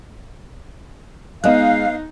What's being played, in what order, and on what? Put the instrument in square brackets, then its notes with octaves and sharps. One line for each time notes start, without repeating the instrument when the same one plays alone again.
[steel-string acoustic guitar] G#3 [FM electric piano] B3 D#5 F#6 [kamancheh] D#4 [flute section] F5